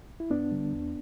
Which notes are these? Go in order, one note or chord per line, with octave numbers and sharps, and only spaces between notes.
E4
G2 B3 D4
D3 G3
E2